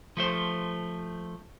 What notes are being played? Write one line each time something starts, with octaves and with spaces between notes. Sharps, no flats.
F3 A3 C5